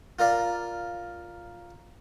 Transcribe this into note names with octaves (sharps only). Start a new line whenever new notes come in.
F4 A#4 D5 F5